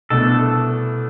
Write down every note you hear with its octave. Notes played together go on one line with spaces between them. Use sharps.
C2 B2 A3 D4 A4